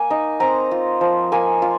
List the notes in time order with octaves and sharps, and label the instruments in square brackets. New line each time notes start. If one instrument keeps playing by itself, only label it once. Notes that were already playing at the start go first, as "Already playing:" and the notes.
Already playing: [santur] A#3 G#5
D#4
C4 A#5
F4
F3
A#3 G#5
F4